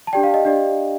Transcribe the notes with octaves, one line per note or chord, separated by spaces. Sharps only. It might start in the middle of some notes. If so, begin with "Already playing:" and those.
A5
D4 G4 D5 G5
F5
D#5
D4 G4 D5